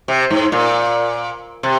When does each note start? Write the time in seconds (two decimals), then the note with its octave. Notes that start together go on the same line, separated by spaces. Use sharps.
0.08 C3
0.31 G#2
0.52 A#2
1.63 C3